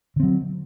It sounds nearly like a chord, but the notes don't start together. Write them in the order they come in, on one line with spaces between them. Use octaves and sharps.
D3 C4 F#3